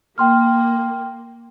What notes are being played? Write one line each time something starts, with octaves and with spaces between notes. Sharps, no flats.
A#3 G5 C6 F6